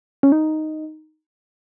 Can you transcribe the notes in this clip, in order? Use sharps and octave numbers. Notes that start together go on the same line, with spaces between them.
C#4
D#4